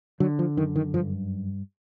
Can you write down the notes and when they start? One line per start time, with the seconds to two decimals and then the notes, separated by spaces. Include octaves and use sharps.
0.20 D3 F#3
0.39 F3
0.57 F#2 D#3
0.76 D#3
0.94 G2 F3